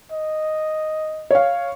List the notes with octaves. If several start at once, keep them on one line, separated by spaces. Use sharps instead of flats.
D#5
C#5 F5